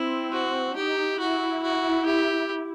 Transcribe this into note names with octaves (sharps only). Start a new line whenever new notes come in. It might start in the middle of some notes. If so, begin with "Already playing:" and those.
Already playing: C4 E4
F#4
D#4 G4
E4 F#4
F#4
G4